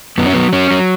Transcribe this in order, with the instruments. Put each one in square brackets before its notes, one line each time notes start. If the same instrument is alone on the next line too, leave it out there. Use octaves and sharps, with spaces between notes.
[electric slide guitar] F#2 B3
C#4
F#3 B3
F#3 C#4
F#3